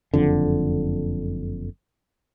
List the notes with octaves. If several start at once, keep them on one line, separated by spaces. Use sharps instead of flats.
F#1 F2 D3